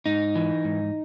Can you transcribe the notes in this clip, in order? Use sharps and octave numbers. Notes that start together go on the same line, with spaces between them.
G#2 D#4
E3
G#2